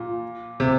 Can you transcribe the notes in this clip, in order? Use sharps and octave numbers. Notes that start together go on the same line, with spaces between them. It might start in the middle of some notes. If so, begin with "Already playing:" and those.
Already playing: A#2
C3